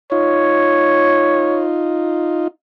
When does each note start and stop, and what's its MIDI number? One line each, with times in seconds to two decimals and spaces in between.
0.12 2.48 63
0.12 2.48 65
0.12 1.67 73